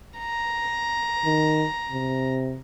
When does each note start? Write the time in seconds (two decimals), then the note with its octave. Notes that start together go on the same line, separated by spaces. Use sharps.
0.19 A#5
1.25 D#3
1.91 C3